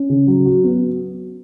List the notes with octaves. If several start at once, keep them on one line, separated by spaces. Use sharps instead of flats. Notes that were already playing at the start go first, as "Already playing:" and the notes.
Already playing: C#4
C#3
F#3
F#4
B3